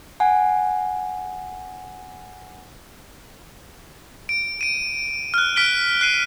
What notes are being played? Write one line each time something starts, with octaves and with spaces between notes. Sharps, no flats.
F#5 G#5
D7
D7 D#7
F6 F#6
F6 B6 D7 G7
F#6 C7 D#7